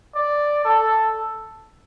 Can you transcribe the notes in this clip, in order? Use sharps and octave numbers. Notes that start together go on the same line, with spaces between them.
D5
A4